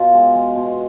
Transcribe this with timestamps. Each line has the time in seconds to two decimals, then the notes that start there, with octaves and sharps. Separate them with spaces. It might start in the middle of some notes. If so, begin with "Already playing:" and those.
Already playing: B2 F4
0.14 G#3
0.35 G#3
0.56 B2